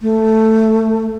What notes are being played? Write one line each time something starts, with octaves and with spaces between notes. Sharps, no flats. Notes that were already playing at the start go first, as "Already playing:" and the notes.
A3